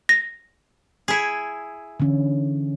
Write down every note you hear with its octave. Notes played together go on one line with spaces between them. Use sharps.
A#6
E4 G#4
D3 E3 C#4